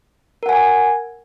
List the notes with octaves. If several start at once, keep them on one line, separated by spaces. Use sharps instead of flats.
A#4 F#5 G#5